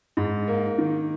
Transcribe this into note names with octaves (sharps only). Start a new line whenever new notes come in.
G#2
A#3
D#3